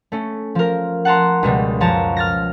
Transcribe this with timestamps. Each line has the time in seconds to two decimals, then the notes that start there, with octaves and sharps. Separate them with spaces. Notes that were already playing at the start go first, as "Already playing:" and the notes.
0.12 A3 C#4
0.55 F3 A#4
1.05 F#5 A5 A#5 C6
1.43 C#2 B2 G3 G#3
1.80 F#2 F3 C#5 A5 A#5
2.17 F6 A6 A#6